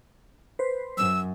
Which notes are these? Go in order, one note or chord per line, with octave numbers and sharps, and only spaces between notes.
B4 C5
F#2 E6